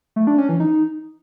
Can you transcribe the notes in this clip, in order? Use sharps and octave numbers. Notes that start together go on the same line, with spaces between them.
A3
D4
C#4
E3
D#4